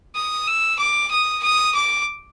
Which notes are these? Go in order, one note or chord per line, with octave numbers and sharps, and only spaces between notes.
D#6
E6
D6
D#6
D#6
D6